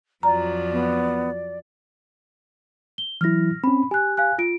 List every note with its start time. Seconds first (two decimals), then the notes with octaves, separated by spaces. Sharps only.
0.23 F2 F3 F#3 D5 A#5
0.72 B3
2.98 G7
3.21 E3 F#3 E4 F6 A#6
3.64 C4 C#4 B5
3.91 G4 G#5 F#6
4.17 F5 G#5 F#6
4.38 F4 D7